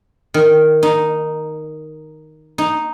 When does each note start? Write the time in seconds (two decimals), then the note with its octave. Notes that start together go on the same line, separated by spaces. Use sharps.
0.34 D#3
0.83 D#4
2.58 D#4